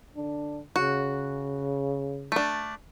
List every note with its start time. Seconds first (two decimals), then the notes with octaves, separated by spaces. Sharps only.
0.14 D3 D4
0.76 C#3 F#4
2.32 A3 D4